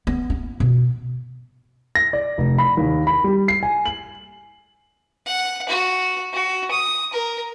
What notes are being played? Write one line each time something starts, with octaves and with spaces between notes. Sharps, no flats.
B3
E4
B2
A#6
D5
F1
B5
D#2
B5
G3
C7
G#5
F#7
F#5
F#4
F#4
D#6
A#4